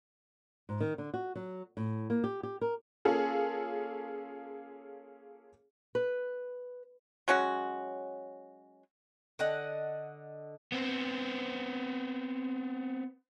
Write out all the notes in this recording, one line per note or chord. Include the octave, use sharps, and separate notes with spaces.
G#2
D#3
D3
F#4
F#3
A2
A#3
G4
G4
A#4
A#3 C#4 F4 G#4 A4
B4
F#3 G#3 C#4 F#4
D3 D#5 F#5
B3 C4